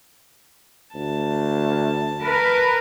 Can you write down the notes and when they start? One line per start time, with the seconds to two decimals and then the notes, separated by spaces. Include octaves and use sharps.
0.95 D2 A5
2.21 A#4 B4